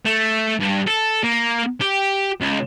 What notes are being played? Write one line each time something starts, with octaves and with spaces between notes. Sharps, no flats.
A3
G2
A4
A#3
G4
C#2